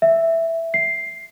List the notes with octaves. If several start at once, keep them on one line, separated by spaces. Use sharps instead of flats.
E5
C7